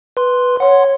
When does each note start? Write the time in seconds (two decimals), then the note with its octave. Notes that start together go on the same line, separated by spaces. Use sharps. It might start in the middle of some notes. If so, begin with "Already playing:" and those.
0.17 B4 C6
0.60 C#5 F#5 C6